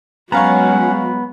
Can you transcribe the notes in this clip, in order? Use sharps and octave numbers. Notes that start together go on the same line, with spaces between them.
F#3 G#3 B3 C#4 C#5 F5 F#5 A#5